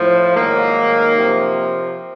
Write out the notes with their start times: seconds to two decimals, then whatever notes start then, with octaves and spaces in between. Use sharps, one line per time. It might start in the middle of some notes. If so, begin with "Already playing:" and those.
Already playing: A2 F3
0.36 G#2 D#3 F#3 A#3
1.15 C3 F3